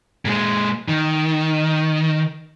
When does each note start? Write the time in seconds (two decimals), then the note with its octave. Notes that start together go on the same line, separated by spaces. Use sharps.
0.25 A#2 G#3
0.88 D#3